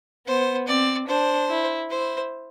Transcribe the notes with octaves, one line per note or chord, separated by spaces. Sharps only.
B3 C5
C4 D5
D4 C5
E4
E4 C5